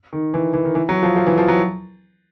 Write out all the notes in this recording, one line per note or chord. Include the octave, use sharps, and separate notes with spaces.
D#3
E3
E3
D#3
E3
F#3
F3
F3
E3
F3
F#3